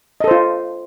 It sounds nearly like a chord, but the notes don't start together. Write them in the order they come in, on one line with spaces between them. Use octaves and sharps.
D#5 A4 C5 F4